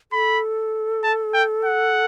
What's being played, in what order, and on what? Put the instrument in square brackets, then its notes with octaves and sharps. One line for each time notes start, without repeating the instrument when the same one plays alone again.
[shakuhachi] A4 [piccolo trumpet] B5
[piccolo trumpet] A5
G5
F#5